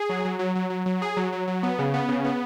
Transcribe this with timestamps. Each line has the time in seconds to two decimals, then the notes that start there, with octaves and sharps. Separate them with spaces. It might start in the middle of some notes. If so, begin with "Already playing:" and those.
Already playing: G#4
0.09 F#3
0.25 F#3
0.39 F#3
0.55 F#3
0.70 F#3
0.86 F#3
1.02 G#4
1.17 F#3
1.32 F#3
1.48 F#3
1.63 B3
1.79 C#3
1.94 B3
2.08 C#3
2.25 B3